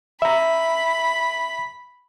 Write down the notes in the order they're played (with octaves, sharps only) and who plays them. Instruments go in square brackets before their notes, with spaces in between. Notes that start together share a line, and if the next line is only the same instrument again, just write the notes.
[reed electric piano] E5 A#5 [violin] B5